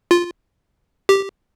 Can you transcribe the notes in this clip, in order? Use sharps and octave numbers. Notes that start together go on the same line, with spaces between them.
F4
G4